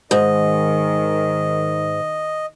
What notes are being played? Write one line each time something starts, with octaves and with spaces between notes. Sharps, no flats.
G#2 D#3 D#5